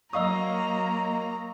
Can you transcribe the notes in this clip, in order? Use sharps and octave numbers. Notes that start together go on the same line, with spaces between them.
F#3 A#3 D#5 F5 A#5 C#6 D#6 E6